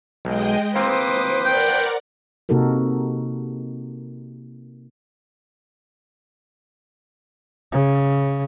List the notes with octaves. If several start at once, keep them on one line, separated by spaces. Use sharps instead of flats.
B1 G#3 D#5 G5
A#3 C4 B4 C5 D6 D#6
A#4 D5 F#5 G5
C3 A#3 D#4 F#4 A4 A#4
C#3